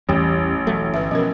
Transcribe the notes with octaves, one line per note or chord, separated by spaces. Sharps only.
A1 E2 G3 C#4
E1 F#3 A3
G1 B4 E5
B2 F3 C#4 A#4